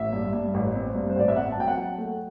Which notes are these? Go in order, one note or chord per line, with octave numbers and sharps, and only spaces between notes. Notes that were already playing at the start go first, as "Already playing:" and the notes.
Already playing: A1 E5
G2
G2
A1
C4
G2
C5
A1 D5
E5
C4 F#5
A5
F#3 G5
F#5
F#3
A3